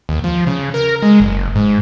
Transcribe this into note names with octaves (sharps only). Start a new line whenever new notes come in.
D#2
F3
C#3
A#4
G#3
F#1
G#2